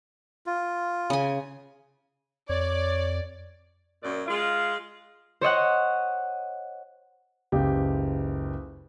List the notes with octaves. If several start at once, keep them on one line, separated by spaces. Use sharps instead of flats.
F4
C#3 G#5
F2 C#5 D5
F#2 A#2 D5
G#3 F4
C5 C#5 D#5 F#5
F#1 C#2 G4